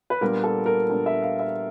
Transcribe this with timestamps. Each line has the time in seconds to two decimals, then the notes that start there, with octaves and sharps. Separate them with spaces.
0.10 B4
0.21 A#2 G3 B3 D4 A#4
0.44 A4
0.66 A#4
0.89 A#2 G3 B3 D4
1.06 E5
1.22 F5
1.39 E5